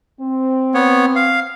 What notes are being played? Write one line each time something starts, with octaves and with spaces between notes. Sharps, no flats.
C4
B3 C#5
F5